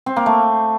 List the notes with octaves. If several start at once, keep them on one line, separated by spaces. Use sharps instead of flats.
C4
A#3
A3